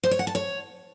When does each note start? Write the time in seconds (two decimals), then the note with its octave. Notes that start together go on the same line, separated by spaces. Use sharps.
0.04 C5
0.11 C#5
0.19 F#5
0.27 A5
0.35 C#5